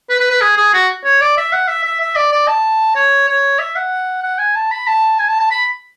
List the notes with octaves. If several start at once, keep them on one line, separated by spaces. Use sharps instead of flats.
B4
B4
B4
G#4
G#4
F#4
C#5
D5
E5
F#5
E5
E5
E5
D5
D5
A5
C#5
C#5
E5
F#5
F#5
G#5
A5
B5
A5
G#5
A5
A5
B5